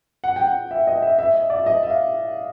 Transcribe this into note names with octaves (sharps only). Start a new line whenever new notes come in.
F#5
G5
F#5
E5
D#5
E5
E5
D#5
D5
E5
D#5
E5
F5